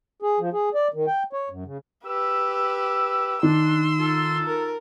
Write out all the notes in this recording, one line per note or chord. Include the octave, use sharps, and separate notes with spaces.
G#4
F3
G#4
D5
D#3
G5
C#5
F#2
C#3
G4 B4 E6
D#3 D4 C6 E6
D#4 F4 A4
A#4